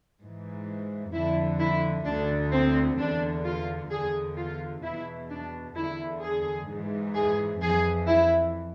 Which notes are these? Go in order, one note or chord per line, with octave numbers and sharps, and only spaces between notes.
G#2 E3
F2 D3 E4
E4
D2 D3 D4
C4
E2 D3 D4
F4
E2 D3 G#4
F4
E2 B2 E4
D4
E2 D3 E4
G#4
G#2 E3
G#4
F2 E3 G#4
E4